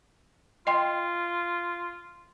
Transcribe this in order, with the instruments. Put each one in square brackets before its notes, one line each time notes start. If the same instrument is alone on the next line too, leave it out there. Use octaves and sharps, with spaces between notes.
[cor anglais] F4 [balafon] D#5 G5 C6